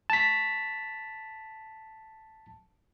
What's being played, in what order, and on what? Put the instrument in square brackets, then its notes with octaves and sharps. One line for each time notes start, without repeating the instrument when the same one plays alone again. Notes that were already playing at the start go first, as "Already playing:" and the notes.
[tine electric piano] A5 B6